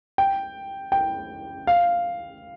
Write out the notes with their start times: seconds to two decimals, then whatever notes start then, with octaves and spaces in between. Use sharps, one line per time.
0.18 G5
0.92 G5
1.67 F5